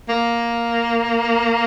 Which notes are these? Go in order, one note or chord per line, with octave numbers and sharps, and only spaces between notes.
A#3